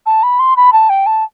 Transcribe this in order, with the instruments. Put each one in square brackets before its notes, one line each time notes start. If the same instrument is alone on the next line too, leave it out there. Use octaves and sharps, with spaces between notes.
[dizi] A5
B5
C6
B5
A5
G5
A5